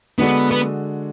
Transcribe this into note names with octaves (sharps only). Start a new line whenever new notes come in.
D3 G#3 B3 D4 F#4 A4
B3